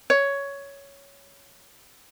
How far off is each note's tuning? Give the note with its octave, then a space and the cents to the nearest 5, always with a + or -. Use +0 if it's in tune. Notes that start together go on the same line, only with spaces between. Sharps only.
C#5 +10